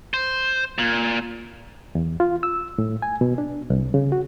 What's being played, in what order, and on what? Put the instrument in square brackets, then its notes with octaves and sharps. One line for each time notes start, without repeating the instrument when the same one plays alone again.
[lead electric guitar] C5
A#2
[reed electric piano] E2
F4
E6
A2
G#5
B2
D4
C2
C#3
F#4